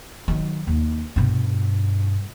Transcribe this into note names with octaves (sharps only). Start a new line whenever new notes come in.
D#3 F#3
D#2
G2 B2